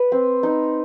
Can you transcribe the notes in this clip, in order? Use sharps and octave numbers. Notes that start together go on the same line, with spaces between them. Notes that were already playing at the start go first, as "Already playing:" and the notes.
Already playing: B4
C4
D#4